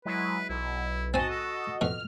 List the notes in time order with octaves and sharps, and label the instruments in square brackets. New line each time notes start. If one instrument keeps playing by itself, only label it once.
[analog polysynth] F#3 G#3 E4 [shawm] B4
[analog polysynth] B1 [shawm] E4
[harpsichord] C4 G#5 [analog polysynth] F#4 D#5 [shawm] A5
[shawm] A4
[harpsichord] F2 B2 [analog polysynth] F6